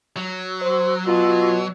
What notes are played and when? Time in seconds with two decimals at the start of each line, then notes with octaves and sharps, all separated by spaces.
0.16 F#3
0.62 C5
1.07 B2 F4